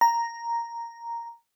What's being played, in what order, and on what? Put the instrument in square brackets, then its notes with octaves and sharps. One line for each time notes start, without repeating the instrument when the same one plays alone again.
[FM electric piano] A#5